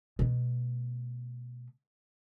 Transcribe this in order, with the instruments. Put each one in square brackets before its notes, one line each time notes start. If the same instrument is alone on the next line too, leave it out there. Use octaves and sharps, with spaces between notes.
[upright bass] B2 A3